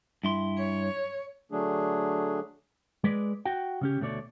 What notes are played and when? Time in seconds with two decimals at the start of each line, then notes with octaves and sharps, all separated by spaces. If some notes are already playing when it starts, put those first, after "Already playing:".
0.24 G2 E4 C6
0.58 C#5
1.52 D3 F#3 A3 D4 G#4
3.04 G#3 B4 D5
3.45 F#4 G5
3.81 C#3 C#4 G4
4.00 D2 B2 A3 C#5 D5